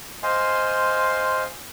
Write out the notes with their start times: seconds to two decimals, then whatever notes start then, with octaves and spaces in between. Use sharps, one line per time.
0.23 C5 D#5 F5 G#5 C6